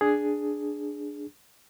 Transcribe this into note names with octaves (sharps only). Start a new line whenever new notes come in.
D4 G#4